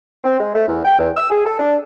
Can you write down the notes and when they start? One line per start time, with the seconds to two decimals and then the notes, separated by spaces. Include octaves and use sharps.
0.24 C4
0.40 G#3
0.55 A3
0.68 E2
0.85 G5
0.99 E2
1.16 E6
1.30 G#4
1.45 A4
1.60 D4